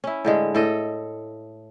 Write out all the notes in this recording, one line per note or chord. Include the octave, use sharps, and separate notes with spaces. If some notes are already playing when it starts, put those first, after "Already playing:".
C#4 E4
A2 D3 G#3
A2 A4 D#5